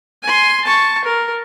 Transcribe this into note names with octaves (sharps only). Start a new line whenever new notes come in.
G#5 C6
A5 C#6
A#4